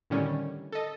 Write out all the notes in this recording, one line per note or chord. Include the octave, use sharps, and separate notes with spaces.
A2 D3 D#3 G3 C#4
A4 D#5